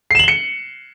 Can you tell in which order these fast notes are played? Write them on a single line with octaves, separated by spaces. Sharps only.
C7 E7 F#7 G7 C#7